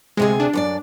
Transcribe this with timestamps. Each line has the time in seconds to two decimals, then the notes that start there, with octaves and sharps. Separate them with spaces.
0.17 D2 C3 G#3 G#4
0.40 D4
0.53 F#2 C5 D5